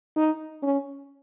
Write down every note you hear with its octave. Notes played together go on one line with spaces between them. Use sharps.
D#4
C#4